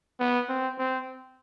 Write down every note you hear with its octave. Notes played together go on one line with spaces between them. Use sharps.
B3
C4
C4